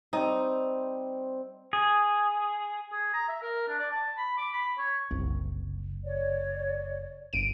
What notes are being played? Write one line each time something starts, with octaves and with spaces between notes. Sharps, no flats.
G3 C4 D#4
G#4
G#4
A#5
E5
A#4
D4
D5
A5
B5
D6
B5
C#5
F#1 C2
C#5 D5
G1 D7 D#7